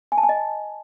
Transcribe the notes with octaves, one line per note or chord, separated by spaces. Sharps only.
G#5
A5
G#5
D#5